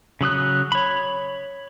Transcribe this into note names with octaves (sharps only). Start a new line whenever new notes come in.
C#3 F#3 D#6 F#6
C#5 B5